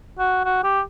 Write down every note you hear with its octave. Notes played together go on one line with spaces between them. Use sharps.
F#4
F#4
G4